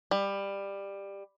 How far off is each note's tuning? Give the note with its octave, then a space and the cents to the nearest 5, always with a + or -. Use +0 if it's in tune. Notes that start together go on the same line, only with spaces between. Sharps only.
G3 +15